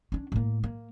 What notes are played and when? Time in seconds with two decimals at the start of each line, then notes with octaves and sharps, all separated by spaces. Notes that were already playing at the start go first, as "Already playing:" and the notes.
0.12 C#4 D4
0.32 A2 A#3
0.64 A#3